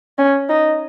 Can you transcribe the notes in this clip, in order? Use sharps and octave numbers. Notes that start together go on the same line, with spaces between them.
C#4
D#4